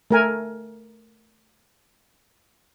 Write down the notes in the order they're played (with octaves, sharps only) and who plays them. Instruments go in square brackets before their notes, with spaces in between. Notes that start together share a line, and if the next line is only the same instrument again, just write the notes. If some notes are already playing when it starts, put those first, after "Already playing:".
[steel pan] A3 A#4 G#5